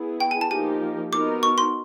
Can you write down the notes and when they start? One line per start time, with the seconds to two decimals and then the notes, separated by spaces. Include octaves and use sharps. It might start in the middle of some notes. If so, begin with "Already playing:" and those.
Already playing: B3 E4 G#4
0.20 G5
0.31 G#5
0.41 A5
0.51 F3 A#3 D#4 G4 A#4 G#5
1.12 B3 D#4 F#4 A#4 D6
1.43 C#6
1.58 C6